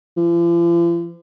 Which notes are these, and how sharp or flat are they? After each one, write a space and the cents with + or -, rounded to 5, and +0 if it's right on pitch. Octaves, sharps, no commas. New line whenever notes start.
F3 -45